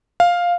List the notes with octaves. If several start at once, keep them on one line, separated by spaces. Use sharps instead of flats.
F5